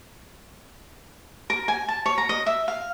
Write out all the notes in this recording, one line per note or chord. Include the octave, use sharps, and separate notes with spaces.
A#4
G#5
A5
C#5
A#5
D#5
E5
F5